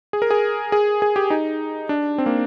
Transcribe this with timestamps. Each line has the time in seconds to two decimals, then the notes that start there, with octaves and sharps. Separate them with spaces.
0.13 G#4
0.22 A#4
0.31 G#4
0.72 G#4
1.02 G#4
1.16 G4
1.30 D#4
1.89 D4
2.18 C4
2.26 A#3